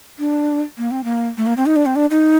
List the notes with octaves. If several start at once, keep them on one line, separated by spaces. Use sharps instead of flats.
D4
A#3
C4
A#3
A3
A#3
C4
D#4
D4
C4
D4
D#4